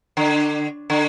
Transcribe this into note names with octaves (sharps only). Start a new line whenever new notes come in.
D3
D3